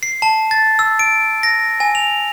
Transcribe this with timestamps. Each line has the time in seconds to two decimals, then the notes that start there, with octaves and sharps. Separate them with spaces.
0.03 C7
0.22 A5
0.51 A6
0.79 E6
0.99 D7
1.43 A#6
1.80 G#5
1.95 F7